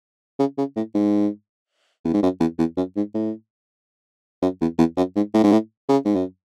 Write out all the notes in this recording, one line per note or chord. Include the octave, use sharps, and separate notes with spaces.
C#3
C#3
A2
G#2
E2
G#2
F#2
E2
E2
F#2
G#2
A2
F#2
E2
E2
F#2
G#2
A2
G#2
A2
C#3
G#2
F#2